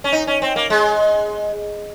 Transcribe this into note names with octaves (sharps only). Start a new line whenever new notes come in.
C#4
D#4
C#4
C4
A#3
G#3